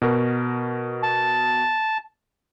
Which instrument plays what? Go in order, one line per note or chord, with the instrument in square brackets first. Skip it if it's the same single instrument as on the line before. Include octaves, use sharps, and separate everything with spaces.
[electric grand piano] B2 F#4 A#4
[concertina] A5